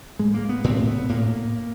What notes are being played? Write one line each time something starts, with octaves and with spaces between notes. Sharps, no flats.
A2 G#3
A#3
B3
A2 C4
B3
A2 A#3